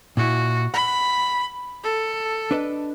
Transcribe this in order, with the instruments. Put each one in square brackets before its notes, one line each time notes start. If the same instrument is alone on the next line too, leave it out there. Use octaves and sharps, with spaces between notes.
[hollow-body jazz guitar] A#2 E4 [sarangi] F#4
[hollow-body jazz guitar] F#5 [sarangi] B5
[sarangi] A4
[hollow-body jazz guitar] D4 B4 D#5